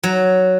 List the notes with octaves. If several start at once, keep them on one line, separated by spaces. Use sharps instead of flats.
F#3